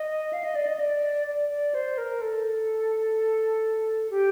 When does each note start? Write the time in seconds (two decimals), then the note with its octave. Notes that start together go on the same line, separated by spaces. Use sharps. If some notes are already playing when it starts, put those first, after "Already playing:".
Already playing: D#5
0.33 F5
0.44 D#5
0.55 D5
0.67 D#5
0.80 D5
1.27 D5
1.51 D5
1.74 C5
1.98 A#4
2.21 A4
4.10 G4